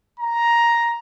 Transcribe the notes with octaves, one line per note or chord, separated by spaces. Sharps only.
A#5